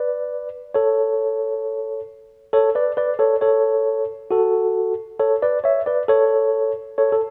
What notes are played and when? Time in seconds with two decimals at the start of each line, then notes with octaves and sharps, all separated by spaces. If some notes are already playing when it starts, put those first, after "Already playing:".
Already playing: B4 D5
0.74 A4 C#5
2.53 A4 C#5
2.75 B4 D5
2.97 B4 D5
3.19 A4 C#5
3.41 A4 C#5
4.31 F#4 A4
5.19 A4 C#5
5.42 B4 D5
5.64 C#5 E5
5.86 B4 D5
6.08 A4 C#5
6.98 A4 C#5
7.12 A4